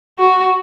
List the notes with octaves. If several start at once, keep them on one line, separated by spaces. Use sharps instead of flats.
F#4